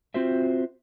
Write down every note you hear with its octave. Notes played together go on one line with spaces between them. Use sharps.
C4 F4 F#4 C5 E5